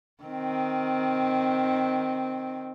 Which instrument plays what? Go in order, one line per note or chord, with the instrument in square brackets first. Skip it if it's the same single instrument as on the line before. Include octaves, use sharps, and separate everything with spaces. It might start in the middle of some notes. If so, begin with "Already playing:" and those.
[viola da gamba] D#3 C4